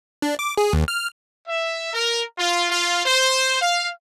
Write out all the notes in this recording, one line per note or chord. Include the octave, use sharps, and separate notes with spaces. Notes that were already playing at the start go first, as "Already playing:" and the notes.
D4
D6
G#4
D#2
F6
E5
A#4
F4
F4
C5
F5